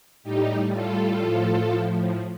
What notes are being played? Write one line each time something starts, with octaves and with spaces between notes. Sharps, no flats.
A2 G3 D#4 G4
F4 A4
A2 F3